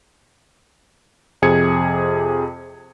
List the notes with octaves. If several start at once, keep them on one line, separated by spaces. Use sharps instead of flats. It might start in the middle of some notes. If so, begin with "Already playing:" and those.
F2 C3 G#4 G#6 C#7